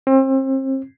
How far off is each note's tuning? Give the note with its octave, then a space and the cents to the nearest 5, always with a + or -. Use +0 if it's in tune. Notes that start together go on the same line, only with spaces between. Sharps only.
C4 +35